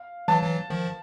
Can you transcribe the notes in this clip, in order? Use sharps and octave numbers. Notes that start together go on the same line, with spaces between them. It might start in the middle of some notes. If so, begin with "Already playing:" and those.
Already playing: F5
E3 F#3 A5
E3 F#3
D#3 F3